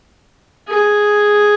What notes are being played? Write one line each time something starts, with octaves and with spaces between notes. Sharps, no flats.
G#4